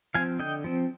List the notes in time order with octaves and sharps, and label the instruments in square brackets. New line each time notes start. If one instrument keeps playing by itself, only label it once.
[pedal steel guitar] F3 C4 F5 G#5
D3 D#5 G5
F3 C4